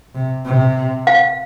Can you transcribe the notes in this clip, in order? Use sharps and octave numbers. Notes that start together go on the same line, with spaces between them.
C3
C3
F5